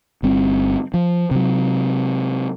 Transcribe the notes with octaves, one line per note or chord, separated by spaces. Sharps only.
G1 G3 C4
F3
C3 F#3